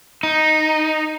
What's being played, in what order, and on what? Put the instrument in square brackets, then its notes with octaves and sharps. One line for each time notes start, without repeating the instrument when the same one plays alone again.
[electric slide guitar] D#4